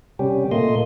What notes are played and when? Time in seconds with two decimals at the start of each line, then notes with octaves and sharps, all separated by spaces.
0.19 C3 G3 C#4 G4
0.51 A#2 A3 A#3 D#5 C6